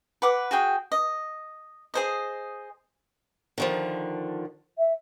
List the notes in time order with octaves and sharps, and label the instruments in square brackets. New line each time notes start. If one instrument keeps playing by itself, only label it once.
[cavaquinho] B4 F#5 D6
F#4 G#4 G5
D#5
G#4 C5 D#5
[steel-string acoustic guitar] D3 D#3 F3
[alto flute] E5